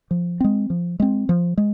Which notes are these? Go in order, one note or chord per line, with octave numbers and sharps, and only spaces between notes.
F3
G#3 C4
F3
G#3 C4
F3
G#3